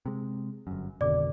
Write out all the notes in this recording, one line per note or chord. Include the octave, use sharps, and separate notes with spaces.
C3 G#3
G1 F#2
G#1 F2 B2 D3 D5 D6